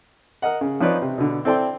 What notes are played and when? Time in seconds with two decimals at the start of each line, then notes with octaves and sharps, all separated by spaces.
0.42 A#4 D#5 F#5
0.61 C#3
0.80 F3 C4 D#4 B4 C#5 D5
1.02 C3
1.18 B2 D3
1.45 C4 E4 A4 D5 G5 C6